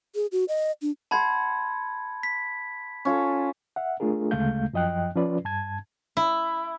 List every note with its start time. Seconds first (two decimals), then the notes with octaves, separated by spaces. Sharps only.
0.15 G#4
0.32 F#4
0.48 D#5
0.82 D4
1.11 F#5 A5 B5 C6 G#6
2.23 B6
3.05 C#4 F4 A4
3.76 E5 F#5
4.00 A3 D4 F4 G#4 A#4
4.31 D2 C#3 G#3 A3 F5 G6
4.73 F#2 F3 D#5 G5 F#6
5.15 F3 C#4 F4 B4 D5
5.45 G2 A5 G#6
6.17 E4